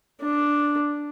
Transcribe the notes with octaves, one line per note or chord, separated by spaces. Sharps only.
D4